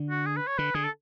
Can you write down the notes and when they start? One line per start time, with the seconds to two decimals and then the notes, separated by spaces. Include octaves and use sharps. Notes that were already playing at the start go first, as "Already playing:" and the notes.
Already playing: D3
0.10 F#4
0.26 G#4
0.37 B4
0.47 C#5
0.58 D3 B4
0.74 D3 G#4
0.85 A4